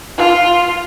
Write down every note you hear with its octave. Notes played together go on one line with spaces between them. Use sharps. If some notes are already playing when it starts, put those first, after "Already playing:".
F4